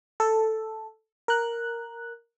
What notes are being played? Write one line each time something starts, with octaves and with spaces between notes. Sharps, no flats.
A4
A#4 F#6